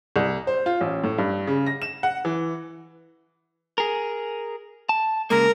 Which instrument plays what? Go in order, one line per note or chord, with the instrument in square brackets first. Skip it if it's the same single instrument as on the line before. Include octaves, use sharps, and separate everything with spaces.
[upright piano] C2
C5
F4
A1
A2
G2
C#3
A#6
E7
F#5
E3
[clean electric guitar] G#4 A#4
A5
[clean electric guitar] C#3 G#3 A#3 [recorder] A#4